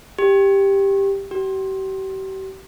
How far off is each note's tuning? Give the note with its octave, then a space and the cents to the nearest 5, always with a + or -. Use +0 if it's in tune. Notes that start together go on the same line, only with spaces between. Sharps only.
G4 +5
G4 -40